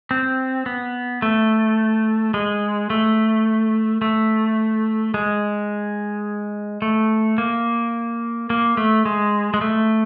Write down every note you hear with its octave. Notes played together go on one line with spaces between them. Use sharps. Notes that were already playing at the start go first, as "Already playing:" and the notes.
C4
B3
A3
G#3
A3
A3
G#3
A3
A#3
A#3
A3
G#3
G#3
A3